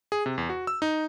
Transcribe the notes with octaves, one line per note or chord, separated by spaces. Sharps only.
G#4
C3
E2
F#4
E6
D#4